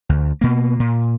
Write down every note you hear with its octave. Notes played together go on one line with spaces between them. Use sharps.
D2
B2 A#3
A#2